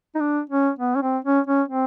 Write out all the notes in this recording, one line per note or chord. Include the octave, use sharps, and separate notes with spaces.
D#4
D4
C#4
B3
C#4
C4
C#4
C#4
C4